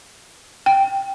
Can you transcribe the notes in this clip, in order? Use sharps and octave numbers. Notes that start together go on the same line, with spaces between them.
G5